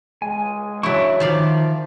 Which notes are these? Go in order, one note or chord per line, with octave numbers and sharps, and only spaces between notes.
G#3 G#5
C#3 F#3 D4 E4 E5 C#6
D#3 F3 D5 F5 A5